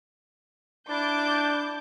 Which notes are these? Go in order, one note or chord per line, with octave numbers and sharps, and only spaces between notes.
D4 E4 A5 D6 G6